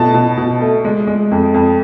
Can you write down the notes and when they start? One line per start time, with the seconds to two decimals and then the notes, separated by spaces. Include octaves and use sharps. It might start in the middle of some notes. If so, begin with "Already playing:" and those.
Already playing: B2 A3 A5
0.14 B2
0.37 B2
0.61 A3
0.85 G#3
1.07 G#3
1.31 F2
1.54 F2